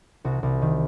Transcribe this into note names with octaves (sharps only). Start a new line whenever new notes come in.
C2 F#4
C2
D#3